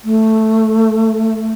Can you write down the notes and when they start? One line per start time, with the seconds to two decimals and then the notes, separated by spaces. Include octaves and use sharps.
0.05 A3